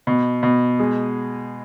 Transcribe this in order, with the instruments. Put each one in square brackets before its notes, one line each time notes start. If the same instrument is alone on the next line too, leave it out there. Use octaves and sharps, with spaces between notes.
[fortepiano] B2
B2
G#3